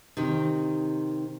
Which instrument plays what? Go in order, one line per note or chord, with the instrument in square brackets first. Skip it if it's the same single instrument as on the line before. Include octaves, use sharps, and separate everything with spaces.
[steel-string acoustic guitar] C3 D#3